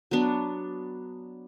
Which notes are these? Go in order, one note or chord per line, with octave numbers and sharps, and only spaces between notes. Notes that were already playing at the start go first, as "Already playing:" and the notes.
F#3 B3 D4